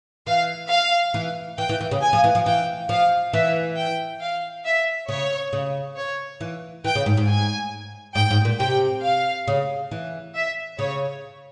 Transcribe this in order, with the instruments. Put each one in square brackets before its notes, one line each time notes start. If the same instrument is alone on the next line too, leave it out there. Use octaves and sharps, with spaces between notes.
[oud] E3 [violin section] F5
[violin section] F5
[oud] E3
[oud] E3 [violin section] G5
[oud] E3
E3
C#3
[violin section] G#5
[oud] F3
E3
F3
[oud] E3 [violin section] G5
[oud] F3 [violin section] F5
[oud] E3 [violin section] E5
[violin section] G5
F5
E5
[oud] C#3 [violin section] C#5
[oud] C#3
[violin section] C#5
[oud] E3
[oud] E3 [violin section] G5
[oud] C#3
G#2
G#2
[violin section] G#5
[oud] G#2 [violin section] G5
[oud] G#2
A#2
[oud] C3 [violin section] G5
[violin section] F5
[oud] C#3
E3
[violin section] E5
[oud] C#3 [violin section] C#5